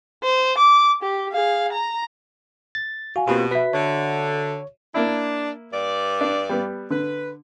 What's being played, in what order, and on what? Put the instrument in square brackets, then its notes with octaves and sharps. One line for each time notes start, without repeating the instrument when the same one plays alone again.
[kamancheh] C5
D6
G4
G#4 F5
A#5
[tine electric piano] A6
[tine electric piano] F#4 [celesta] F5 G#5
[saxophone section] B2 [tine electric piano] A#3 C4 F4 [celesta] G4
[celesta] F#4 E5 [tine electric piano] B4 B6
[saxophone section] D3 [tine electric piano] C#5
[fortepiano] A#3 E4 [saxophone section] D4
[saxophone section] G2 D5
[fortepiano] D4
G3 B3
[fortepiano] D3 [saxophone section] B4